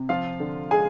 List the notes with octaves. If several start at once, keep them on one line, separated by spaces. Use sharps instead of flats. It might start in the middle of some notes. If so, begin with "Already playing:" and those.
Already playing: C3
F3 F4 F5
D3
G#3 G#4 G#5